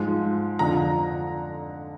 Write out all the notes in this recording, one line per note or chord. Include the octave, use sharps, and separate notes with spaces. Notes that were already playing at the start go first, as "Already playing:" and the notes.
Already playing: G#2 F3 G#3
F2 D3 F3 A#5